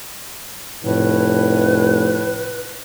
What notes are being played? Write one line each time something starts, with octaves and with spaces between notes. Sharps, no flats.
F1 A2 B4